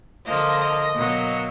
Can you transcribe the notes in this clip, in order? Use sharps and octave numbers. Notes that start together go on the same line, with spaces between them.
D3 F3 A#3 D#5
D#5
B2 F#3 A#3